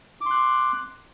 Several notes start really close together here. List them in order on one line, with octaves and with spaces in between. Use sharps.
D6 C6 F#6